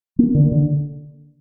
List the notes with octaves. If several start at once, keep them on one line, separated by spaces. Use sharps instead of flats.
A#3
D3
D3